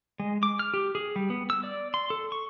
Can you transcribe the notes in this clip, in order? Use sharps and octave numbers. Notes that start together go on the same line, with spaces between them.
G#3
D6
F6
G4
G#4
G3
B3
E6
D5
C6
A4
C#6